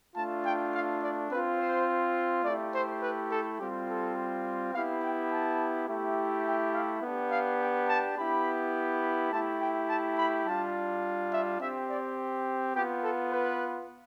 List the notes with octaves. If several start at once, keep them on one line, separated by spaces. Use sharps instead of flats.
A3 D4 F4 A5
G5
F5
D5
C4 F4 B4
C5
A3 E4 G4 D5
C5
B4
A4
G3 C4 F4 G4
A4
B3 E4 G4 F5
G5
A5
A3 E4 G4
G5
F5
B3 D4 G4
F5
G5
A5
B3 E4 G4 B5
A3 E4 G4 A5
G5
A5
B5
G3 D4 F4 A5
E5
C4 G4 E5
D5
B3 F4 G4
A4
B4